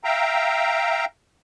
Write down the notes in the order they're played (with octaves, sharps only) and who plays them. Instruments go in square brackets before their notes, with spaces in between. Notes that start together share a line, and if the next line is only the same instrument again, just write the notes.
[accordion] E5 F5 G5 A#5